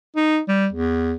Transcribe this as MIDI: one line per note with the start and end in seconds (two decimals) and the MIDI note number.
0.16 0.40 63
0.48 0.68 55
0.73 1.14 40